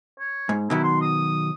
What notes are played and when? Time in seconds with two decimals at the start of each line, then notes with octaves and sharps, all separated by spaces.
0.20 C#5
0.49 G#2
0.70 B2 D#3 F#3 E4
0.83 C6
1.02 D#6